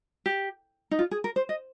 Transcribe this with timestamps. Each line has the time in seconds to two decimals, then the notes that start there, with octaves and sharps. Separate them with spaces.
0.26 G4
0.91 D#4
0.99 F4
1.11 G#4
1.24 A#4
1.36 C5
1.49 D#5